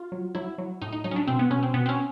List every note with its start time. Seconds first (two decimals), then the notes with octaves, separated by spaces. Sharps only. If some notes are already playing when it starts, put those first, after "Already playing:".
Already playing: F4
0.12 F#3
0.35 F#3 E4
0.58 F#3
0.82 A2 D#4
0.93 D#4
1.04 F#3 D#4
1.11 C#4
1.16 D4
1.27 B2 C4
1.39 B3
1.50 B2 C#4
1.63 C4
1.74 B2 B3
1.86 C4
1.89 C#4